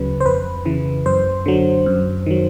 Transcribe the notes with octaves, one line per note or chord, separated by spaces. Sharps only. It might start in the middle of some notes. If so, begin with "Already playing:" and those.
Already playing: D2 C#3 F#3 B4
C5
F2 B4
C#3 E3
F#2 C5
D3 F#3
F#2
D#3 F#3